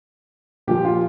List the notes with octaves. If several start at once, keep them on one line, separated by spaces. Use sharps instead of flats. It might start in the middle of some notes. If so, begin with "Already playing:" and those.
A#2 F3 G4
F4